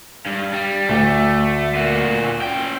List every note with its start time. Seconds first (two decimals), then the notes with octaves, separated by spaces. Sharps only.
0.26 G2
0.53 G3
0.89 D2 A3
1.75 A#2 F#4
2.42 C#4 G5